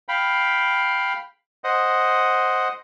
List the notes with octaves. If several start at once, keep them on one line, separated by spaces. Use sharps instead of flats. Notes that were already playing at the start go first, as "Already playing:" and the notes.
F5 G5 B5
C5 D#5 F#5